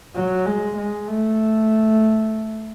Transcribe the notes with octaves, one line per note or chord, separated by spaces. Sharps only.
F#3
G#3
G#3
A3